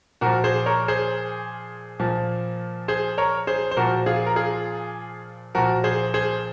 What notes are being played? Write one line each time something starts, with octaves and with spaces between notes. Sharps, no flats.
A#2 F3 F#4 A#4
G#4 C5
A#4 C#5
G#4 C5
A#2 F3
G#4 C5
A#4 C#5
G#4 C5
C5
A#2 F3 F#4 A#4
F4 G#4
A#4
F4 G#4
A#2 F3 F#4 A#4
G#4 C5
G#4 C5